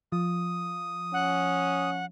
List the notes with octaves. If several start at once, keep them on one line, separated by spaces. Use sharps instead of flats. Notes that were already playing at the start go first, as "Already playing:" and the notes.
F3 D#6
C#4 F#5